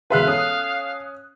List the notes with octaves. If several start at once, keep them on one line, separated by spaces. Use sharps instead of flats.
E1 G#4 B4 E5 F5 C6 F#6
C#4 A4 D#6